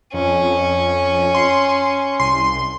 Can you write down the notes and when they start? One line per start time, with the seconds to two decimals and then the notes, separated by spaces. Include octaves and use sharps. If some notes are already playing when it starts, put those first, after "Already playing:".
0.14 F2 C#4
1.35 C6
2.20 C2 C6